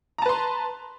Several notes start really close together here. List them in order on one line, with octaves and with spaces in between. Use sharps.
A#5 A5 B4 C6